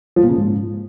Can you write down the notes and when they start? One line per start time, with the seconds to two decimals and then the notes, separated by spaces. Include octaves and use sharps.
0.16 F3
0.23 A#2
0.29 C#3
0.36 G#2